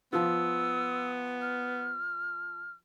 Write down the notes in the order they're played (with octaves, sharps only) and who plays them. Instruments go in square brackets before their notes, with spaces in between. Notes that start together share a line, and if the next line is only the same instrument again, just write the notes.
[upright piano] F3 F4 [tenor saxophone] B3 [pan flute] E6
[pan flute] F6